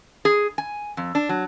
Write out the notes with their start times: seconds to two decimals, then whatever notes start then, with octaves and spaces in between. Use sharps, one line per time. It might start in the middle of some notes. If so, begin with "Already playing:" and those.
0.25 G#4
0.58 G#5
0.97 F2
1.15 D4
1.29 F#3